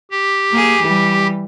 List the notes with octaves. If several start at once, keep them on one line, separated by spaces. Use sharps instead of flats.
G4
A#3 G#4
E3 G3